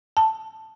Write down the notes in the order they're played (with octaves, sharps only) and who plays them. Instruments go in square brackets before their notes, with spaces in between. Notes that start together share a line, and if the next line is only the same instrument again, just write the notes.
[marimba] A5